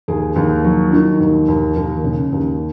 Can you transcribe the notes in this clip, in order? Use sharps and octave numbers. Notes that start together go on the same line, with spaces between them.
D#2 G#4
D#2
F#3
D#3
D#2
D#2
D#2 A#4
C#3
D#2